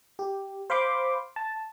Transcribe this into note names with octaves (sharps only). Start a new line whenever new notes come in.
G4
C5 F5 B5 C6 D6
A5